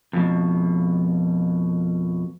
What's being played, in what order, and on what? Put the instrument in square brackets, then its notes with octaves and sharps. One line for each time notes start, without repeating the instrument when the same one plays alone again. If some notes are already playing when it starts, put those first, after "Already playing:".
[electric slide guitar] F2 B2